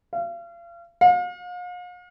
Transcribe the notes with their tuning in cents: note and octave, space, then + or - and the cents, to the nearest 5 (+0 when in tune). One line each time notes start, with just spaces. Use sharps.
F5 -35
F5 +40